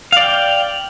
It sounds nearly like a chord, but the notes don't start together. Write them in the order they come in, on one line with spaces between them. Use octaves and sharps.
F5 D5 G5